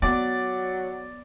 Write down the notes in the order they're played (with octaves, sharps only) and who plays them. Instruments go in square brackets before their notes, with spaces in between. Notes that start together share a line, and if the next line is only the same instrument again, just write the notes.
[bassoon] F#3 [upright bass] B3 [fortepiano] D5